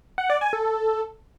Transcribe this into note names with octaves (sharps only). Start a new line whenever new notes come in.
F#5
D5
G#5
A4